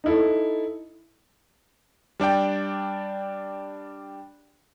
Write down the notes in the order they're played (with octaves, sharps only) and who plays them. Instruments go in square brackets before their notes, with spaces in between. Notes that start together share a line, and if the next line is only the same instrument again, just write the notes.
[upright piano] D#4 E4 A4
[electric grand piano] G3 D4 D5 G5